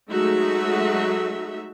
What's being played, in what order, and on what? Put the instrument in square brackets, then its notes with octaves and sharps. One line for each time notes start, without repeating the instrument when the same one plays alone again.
[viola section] F#3 G#3 A3 D#4 F#4 E5